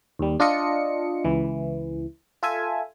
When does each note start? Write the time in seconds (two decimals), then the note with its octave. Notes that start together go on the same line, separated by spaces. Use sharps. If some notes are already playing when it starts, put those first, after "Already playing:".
0.19 D#2 G3
0.40 D4 F4 D#5 C#7
1.24 C#2 E3
2.43 F4 A4 E5 G#5